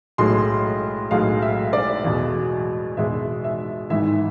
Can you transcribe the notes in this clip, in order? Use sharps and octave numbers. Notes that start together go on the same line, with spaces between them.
B1 A2 G#3 C6
B1 A2 G#3 F5
E5
D5
E2 B2 G#3
E2 B2 G#3 E5
E5
G#1 G#2 E3 E5